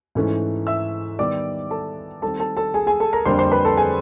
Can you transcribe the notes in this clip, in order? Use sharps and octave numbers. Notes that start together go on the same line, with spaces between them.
G#2 E3 A3 C#4
E5 E6
D#3 G3 B3 D5 D6
A4 A5
D#3 G3 C4 A4 A5
A4 A5
A4 A5
G#4 G#5
G#4 G#5
A4 A5
A#4 A#5
F2 D3 G3 A#3 D4 C5 C6
C5 C6
B4 B5
A4 A5
G#4 G#5